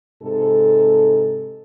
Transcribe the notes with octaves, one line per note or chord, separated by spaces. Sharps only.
G#2 C3 A4